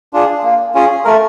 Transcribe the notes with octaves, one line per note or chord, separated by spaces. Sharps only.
D4 F4 G#4
A#3
C#4 F4 G#4
A3 A#4